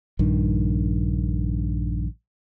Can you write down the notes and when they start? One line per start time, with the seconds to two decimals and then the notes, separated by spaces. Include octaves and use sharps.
0.19 A#1 G2 D#3